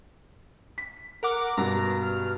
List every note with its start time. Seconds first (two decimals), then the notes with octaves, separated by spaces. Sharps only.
0.78 B6
1.23 A#4 F#5 D6
1.57 G2 B2 A#5
2.03 F6